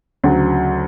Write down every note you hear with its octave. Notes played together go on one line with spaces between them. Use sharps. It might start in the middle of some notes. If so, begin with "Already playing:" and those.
D2 C#3 F#3